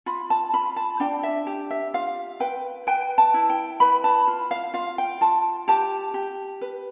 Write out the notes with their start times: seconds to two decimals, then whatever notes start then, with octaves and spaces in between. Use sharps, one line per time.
0.06 F4 B5
0.30 A5
0.53 F4 B5
0.76 A5
1.00 D4 G5
1.23 E5
1.47 G4
1.71 E5
1.94 F4 F5
2.40 B4 G5
2.87 B4 G5
3.18 A5
3.34 E4
3.50 G5
3.80 B4 B5
4.04 A5
4.28 F4
4.51 F5
4.74 F4 F5
4.98 G5
5.21 F4 A5
5.68 G4 A5
6.14 G4
6.61 B4